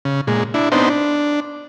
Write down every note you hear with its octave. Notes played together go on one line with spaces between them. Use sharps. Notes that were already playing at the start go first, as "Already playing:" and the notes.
C#3
A#2 G#3
D4 E4
B3 C4 D4 D#4 C5
D4